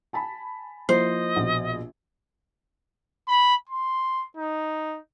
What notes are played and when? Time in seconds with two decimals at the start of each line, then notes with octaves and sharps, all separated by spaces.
0.13 G#5 A5 B5
0.89 F3 A#3 E4 C5 D#5
1.36 A#1 B2
3.28 B5
3.69 C6
4.37 D#4